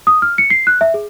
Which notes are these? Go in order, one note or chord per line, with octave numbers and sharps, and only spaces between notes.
D#6
F6
C#7
C7
F#6
E5
G#4